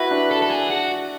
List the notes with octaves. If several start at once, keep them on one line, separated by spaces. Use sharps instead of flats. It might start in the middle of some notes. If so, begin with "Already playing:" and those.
Already playing: E4 F#4 B4
D4
A4
A4
G#4
F#4